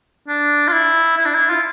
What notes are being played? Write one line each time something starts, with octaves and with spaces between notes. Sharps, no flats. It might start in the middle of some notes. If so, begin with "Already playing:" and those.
D4
F4
E4
E4
D4
E4
F4